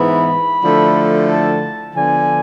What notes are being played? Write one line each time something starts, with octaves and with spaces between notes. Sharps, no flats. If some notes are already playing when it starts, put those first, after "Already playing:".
Already playing: G#2 E3 B3 B5
D3 F3 A3 E4
A5
D3 F3 B3 D4 G#5